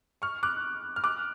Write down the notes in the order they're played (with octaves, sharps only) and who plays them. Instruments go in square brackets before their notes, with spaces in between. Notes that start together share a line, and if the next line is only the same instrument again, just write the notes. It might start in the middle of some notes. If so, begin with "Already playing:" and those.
[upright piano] C#6 F6
D6 F#6
F6
D6 F#6